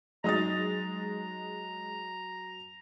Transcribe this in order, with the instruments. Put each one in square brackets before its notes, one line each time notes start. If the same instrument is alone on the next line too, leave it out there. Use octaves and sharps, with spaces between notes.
[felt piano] F#3 D#6 A6 [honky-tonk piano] G#3 D#4 [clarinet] A#5